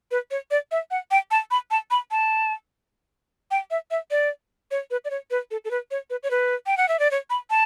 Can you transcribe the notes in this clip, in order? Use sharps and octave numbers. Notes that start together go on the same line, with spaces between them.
B4
C#5
D5
E5
F#5
G5
A5
B5
A5
B5
A5
G5
E5
E5
D5
C#5
B4
D5
C#5
B4
A4
A4
B4
C#5
B4
C#5
B4
G5
F#5
E5
D5
C#5
B5
A5